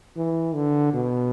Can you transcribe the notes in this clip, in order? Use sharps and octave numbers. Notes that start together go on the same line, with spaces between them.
E3
D3
B2